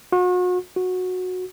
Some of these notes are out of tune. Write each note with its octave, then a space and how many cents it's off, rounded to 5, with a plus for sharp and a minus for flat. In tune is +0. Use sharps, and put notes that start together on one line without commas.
F#4 -40
F#4 -15